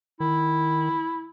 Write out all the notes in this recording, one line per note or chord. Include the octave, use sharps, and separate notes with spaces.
D#3 E4